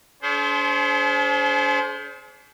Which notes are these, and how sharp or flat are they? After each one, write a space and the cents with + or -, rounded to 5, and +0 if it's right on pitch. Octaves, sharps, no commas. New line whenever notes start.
D4 -45 G#4 +40 C5 +0